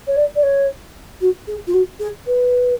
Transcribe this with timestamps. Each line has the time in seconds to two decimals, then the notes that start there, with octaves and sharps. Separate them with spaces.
0.07 C#5
0.16 D5
0.35 D5
0.43 C#5
1.21 F#4
1.47 G#4
1.67 F4
1.74 F#4
1.99 G#4
2.26 B4